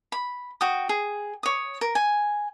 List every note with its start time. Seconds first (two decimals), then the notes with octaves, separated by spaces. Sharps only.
0.12 B5
0.61 F#4 G5 D#6
0.89 G#4
1.43 C#5 D#6
1.81 A#4
1.95 G#5